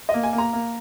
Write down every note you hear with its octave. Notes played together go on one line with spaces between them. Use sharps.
D#5
A#3
G#5
A#3
A#5
A#3